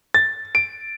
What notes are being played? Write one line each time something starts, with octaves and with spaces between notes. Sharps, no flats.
A6
D7